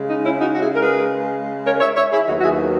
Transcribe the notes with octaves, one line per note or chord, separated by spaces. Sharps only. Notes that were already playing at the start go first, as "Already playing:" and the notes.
Already playing: C#3 G#3
D#4
C#4 E4
D#4 F#4
F#4
E4 G#4
A#4
G#4 B4
A#4 C#5
C#5 E5
C#5 E5
E4 G#4
D#2 D#3 F#3 B3 D#4 F#4
F#4
E4 G#4